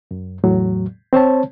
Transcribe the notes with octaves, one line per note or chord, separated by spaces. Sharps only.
F#2
E2 A2 F#3
C4 C5 C#5 A5